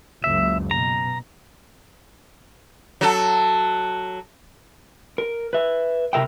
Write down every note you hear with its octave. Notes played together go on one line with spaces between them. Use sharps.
F#1 C#2 E5
B2 A#5
F#3 A4
A#4
B4 E5
C3 A#4 E5 G5